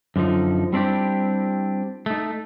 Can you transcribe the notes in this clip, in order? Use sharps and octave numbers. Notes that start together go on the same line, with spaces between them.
F#2 D3 F3 D#4
G3 C4 D4 E4 G4
A3 D#4